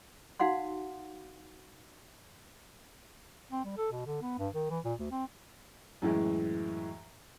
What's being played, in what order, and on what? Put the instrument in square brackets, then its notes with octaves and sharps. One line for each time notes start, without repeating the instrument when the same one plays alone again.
[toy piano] D#4 F#4 F5 F#5 C6
[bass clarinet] C4
G3
A4
B2
D3
B3
G2
D#3
E3
A#2
D2
C4
[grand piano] F#2 A2 E3 G#3